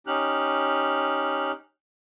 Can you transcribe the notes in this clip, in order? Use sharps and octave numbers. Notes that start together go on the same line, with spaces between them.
C#4 D#4 G4 F6 F#6